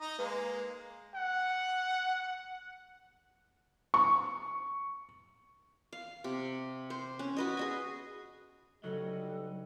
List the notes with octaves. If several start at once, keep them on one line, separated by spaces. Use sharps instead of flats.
D#4 D#5 A#5
G#3 A#3 B4
F#5
C#6
F5
C3
C5
C#4
F#4 B4 D#5
G#4 D#5 G#5
D2 C#3 F#3 G3 D#4 A4 D#5